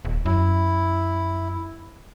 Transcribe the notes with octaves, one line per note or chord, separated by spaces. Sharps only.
D#1
F#2 E4